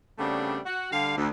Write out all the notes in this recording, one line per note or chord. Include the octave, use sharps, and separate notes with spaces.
C#3 G3 A3 B3 C4 D4
F#4 F#5
D3 G3 F5
D2